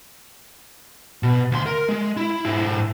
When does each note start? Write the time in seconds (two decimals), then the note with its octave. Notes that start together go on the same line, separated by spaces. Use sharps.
1.23 B2
1.52 D2 C6
1.66 A#4
1.89 G#3
2.17 E4
2.45 G#2 E4